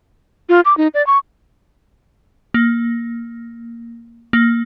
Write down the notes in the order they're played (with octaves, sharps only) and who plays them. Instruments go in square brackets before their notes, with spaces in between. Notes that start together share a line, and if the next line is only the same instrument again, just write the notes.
[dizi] F4
D6
D#4
D5
C#6
[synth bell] A#3
A#3